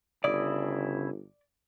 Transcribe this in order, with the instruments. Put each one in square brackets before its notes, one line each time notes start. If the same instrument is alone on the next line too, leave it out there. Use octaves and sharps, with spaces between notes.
[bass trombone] G1 [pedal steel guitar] C#3 E4 D#6 [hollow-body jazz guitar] D5